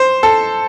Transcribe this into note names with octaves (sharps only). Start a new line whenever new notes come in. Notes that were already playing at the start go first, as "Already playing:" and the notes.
Already playing: C5
A4